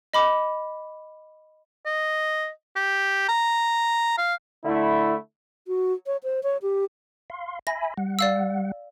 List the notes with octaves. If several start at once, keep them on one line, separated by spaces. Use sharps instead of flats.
D#5 B5 D6
D#5
G4
A#5
F5
D3 A3 E4
F#4
C#5
C5
C#5
G4
F5 C6
E5 G#5 B5 A#6
G3 F#5
D5 F5 E6